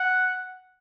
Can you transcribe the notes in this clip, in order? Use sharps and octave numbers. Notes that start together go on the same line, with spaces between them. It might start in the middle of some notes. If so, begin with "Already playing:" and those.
Already playing: F#5